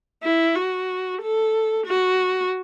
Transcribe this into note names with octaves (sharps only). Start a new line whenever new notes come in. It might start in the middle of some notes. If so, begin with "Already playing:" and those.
E4
F#4
A4
F#4